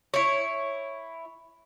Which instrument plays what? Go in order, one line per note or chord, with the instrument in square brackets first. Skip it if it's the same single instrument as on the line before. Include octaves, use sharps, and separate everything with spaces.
[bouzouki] E4 C#5